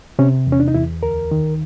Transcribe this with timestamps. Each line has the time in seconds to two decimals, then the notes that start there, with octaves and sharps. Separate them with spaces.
0.19 C3 C#4
0.47 E2
0.52 C#4
0.60 D4
0.68 D#4
0.74 E2 E4
1.03 D2 A#4
1.31 D#3